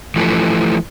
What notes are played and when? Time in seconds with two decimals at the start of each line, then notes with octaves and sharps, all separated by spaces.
0.16 E3 F3 A3